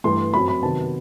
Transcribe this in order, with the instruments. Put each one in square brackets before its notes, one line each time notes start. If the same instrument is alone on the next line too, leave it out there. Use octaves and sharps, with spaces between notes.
[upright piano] G2 E3 A3 C6
F#2 F#3 C4 B5
B5
C3 D#3 F#3 B3 A5